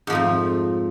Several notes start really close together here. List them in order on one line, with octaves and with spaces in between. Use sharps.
G#2 F3 A3 F2